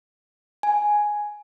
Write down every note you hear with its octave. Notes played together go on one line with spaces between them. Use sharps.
G#5